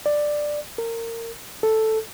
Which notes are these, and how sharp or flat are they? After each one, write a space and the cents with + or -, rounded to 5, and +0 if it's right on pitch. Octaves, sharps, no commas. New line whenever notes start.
D5 +10
A#4 -25
A4 +0